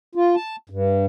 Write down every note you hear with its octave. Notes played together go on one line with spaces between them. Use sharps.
F4
A5
G2